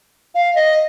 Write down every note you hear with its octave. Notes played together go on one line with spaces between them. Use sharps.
F5
D#5